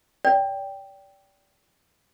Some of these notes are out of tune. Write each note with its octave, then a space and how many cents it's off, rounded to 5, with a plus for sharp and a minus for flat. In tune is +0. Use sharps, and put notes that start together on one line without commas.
D5 -35 G5 +0